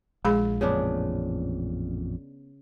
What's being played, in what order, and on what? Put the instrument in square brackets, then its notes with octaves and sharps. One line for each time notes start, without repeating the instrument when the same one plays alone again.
[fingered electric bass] A#1 [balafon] G#3 G#4 B5
[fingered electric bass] A1 F2 A#2 [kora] C#3 B3 D4